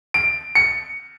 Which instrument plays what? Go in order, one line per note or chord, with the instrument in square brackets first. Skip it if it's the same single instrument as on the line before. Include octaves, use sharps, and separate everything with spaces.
[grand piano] D7
C#7